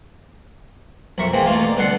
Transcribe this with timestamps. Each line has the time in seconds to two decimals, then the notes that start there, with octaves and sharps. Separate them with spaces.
1.18 B1 F2 A#4 E5 C#6
1.33 E3 G#3 A#3 C4
1.46 B2 E3 A3 A#3 F4
1.61 D#4 D5
1.77 G2 B2 D3 A4 F#5 C6